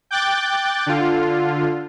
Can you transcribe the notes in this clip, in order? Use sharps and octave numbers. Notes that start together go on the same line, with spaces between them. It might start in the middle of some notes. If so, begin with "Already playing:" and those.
G5 D6 F#6 G6 A6
D3 F4